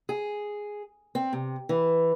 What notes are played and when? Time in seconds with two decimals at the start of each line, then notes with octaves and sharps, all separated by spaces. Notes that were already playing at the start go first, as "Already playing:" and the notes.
0.09 G#4
1.15 C4
1.33 C3
1.69 E3